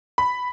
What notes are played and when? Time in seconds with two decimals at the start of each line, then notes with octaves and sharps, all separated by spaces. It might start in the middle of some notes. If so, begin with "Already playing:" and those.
0.18 B5